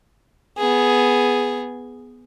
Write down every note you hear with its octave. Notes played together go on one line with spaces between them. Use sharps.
B3 G#4